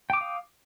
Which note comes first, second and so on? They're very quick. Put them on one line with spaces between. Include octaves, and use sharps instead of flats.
G5 D6 D#6 F5